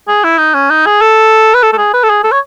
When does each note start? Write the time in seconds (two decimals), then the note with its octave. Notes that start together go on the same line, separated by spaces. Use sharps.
0.08 G#4
0.24 E4
0.38 D#4
0.54 C#4
0.70 D#4
0.86 G#4
1.01 A4
1.54 B4
1.63 A4
1.73 A4
1.78 G#4
1.93 B4
2.03 A4
2.10 G#4
2.24 A4
2.32 C#5